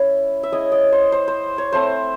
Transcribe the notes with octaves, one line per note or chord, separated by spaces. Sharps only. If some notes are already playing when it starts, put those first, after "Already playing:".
Already playing: C#4 E4
E5
G#3 C#4 E4 D#5
D#5
C5
C5
C5
C#5
A3 C4 E4 C5